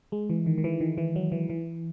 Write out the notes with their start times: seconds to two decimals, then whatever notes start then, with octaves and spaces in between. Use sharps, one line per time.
0.12 G#3
0.30 E3
0.46 D#3
0.58 D#3
0.64 E3
0.81 D#3
0.98 E3
1.16 F#3
1.32 E3
1.50 E3